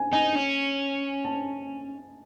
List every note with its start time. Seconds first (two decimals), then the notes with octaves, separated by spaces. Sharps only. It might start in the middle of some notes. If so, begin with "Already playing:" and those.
Already playing: G#5
0.12 D#4 G#5
0.35 C#4
1.25 A5